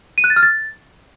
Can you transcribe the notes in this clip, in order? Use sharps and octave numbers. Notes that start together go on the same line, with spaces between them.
D#7
F#6
A6
F6
A6